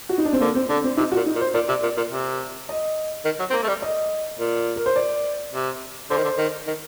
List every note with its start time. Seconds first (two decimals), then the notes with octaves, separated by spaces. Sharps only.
0.09 F#4
0.18 D#4
0.25 D4
0.33 C4
0.40 D3 A#3
0.55 C4
0.69 D3 D4
0.84 C4
0.97 C3 D#4
1.12 F#4
1.16 A#2
1.26 D#4
1.35 A#2
1.41 C5
1.54 A#2 D5
1.69 C3
1.83 A#2
1.97 A#2
2.12 C3
2.69 D#5
3.25 D#3
3.40 F#3
3.50 C4
3.53 A#3
3.63 A3
3.68 G3
3.82 D#5
4.39 A#2
4.76 A#4
4.86 C5
4.96 D5
5.53 C3
6.10 D3 C5
6.17 D#3
6.25 D3
6.38 D#3
6.67 D#3